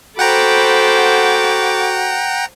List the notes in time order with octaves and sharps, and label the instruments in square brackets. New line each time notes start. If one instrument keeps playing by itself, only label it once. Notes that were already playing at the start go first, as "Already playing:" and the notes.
[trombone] F#4 [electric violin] A4 D6 [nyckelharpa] C5 B5 [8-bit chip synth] F#5 G5 A#5